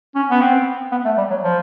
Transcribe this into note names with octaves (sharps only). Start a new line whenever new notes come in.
C#4
B3
C4
B3
A3
G3
F#3
F3